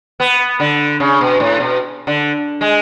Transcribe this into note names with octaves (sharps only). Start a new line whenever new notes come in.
B3
D3
C#3
B2
A2
B2
D3
G#3